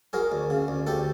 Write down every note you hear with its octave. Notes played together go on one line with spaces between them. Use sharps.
F#3 G#4 A#4
D2
C#3
D2
D2 G4 A4